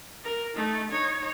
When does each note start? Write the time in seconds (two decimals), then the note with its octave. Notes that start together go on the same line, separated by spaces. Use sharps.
0.24 A#4
0.55 A3 D#4
0.91 D#4 C#5